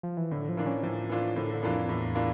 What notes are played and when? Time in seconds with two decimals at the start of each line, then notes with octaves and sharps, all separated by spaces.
0.03 F3
0.17 E3
0.31 A2 D3
0.49 F3
0.57 E3 A#3 D4 F4
0.66 C#4
0.83 A2 F3
1.09 E3 A#3 D4 F4
1.36 A2 D3
1.53 D3
1.63 E2 E3 A#3 D4 F4
1.72 F2
1.89 E2 A2
2.15 E3 A#3 D4 F4